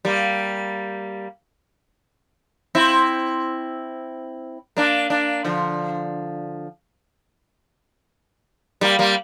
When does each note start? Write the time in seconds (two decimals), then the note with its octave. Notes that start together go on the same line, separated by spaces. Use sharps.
0.05 G3 A#3
2.75 C4 E4
4.77 A#3 D4
5.10 A#3 D4
5.45 D3 F3
8.81 G3 A#3
8.99 G3 A#3